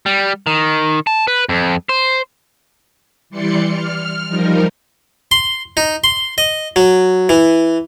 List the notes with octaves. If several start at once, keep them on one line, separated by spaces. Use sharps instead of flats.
G3
D#3
A5
B4
F2
C5
E3 G3 D5 C6 C#7
F6
F3 G3 D#4 A#4
C6
D#4
C6
D#5
F#3
E3